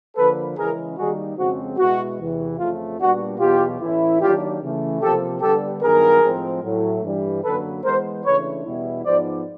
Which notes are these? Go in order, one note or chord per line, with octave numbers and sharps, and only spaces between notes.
D3 F3 A#3 A4 B4
C#3 E3 G#3 C#4 E4 G#4 A#4
D#3 G3 A#3 D#4 F#4 G#4
F2 C#3 F3 G#3 C4 F#4
B2 G#3 B3 E4 F#4
E2 C3 E3
F2 C#3 F3 A3 F4
A#2 G3 B3 D4 F#4
E2 B2 F#3 F4 G4
A2 E3 A3 C#4 E4
D#3 F#3 A#3 D4 F4 G4
C#3 E3 A3
C3 F3 A#3 G4 A4
D3 G3 B3 D4 G4 A4
G2 D#3 F#3 B3 G#4 A#4
A2 F3 G#3 C4
A2 F#3 A3
G2 E3 G3
F#2 D3 F#3 A#3 A4 B4
E3 G#3 B3 A#4 C5
C#3 E3 A3 D4 B4 C#5
E2 B2 G3 B3 E4
G#2 F3 G#3 B3 D#4 C5 D5